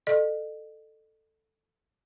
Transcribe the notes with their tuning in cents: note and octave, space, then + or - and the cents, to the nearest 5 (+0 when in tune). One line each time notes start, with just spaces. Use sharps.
A4 +5 D#5 -40